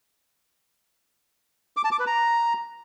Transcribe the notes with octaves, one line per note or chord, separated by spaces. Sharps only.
D6
A5
D6
B4
A#5